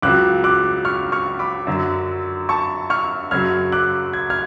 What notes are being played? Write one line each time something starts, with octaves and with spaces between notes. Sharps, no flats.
C#2 C#3 F#3 D6 F#6
D6 F#6
C#6 F6
C#6 F6
B5 D6
F#2 D3 F#3
A5 C#6
C#6 F6
F#2 C#3 F#3 F6 G#6
D6 F#6
G#6
F6 G#6